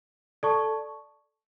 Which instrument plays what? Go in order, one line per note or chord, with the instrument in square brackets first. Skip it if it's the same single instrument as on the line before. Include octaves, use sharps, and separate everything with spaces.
[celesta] A4 D5 A5 C#6